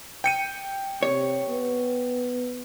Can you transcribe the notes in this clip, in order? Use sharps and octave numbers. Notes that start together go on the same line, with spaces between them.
G5 C#7 D#7
C3 C#5
B3